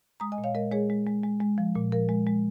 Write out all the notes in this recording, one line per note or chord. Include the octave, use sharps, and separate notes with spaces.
G#3 A#5 D#6
D#5 G#5
A#2
C#5 F5
G#3 A#4 D#5
G#3 G#4 C#5
G#3
G#3
G#3
G#3
F3
A#2
F3 A#4
G#3
G#3